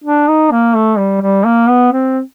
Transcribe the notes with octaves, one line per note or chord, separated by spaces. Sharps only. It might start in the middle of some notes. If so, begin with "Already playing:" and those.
D4
D#4
A#3
A3
G3
G3
A#3
B3
C4